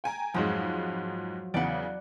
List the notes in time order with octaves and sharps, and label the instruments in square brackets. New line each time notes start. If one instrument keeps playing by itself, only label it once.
[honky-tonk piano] G5 G#5 A#5
[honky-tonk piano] F2 G#2 G#3 [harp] F3 F#3
[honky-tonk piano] E2 C#3 [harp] D5 F#5